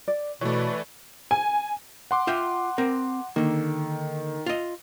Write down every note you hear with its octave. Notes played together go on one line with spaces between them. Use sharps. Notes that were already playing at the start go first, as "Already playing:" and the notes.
D5
B2 E3 A3 B4 C#5 D5 C#6
G#5
F#5 C6 D6
F4 E5 G5
C4 A#4
D3 D#3 A#3
F4 D#5